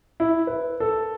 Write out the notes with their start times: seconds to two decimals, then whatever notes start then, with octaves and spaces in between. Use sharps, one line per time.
0.20 E4
0.47 B4
0.80 A4